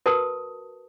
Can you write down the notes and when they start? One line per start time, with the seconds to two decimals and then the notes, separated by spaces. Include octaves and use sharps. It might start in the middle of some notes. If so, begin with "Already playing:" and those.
0.06 F#4 A#4 B4 A5 D#6